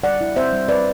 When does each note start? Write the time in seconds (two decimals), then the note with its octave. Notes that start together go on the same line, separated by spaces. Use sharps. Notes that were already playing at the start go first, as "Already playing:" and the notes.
0.04 G3 D5 F#5
0.21 E4
0.36 C4 C5 E5
0.53 G3
0.68 C4 B4 D5